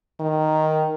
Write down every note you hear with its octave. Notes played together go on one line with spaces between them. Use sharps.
D#3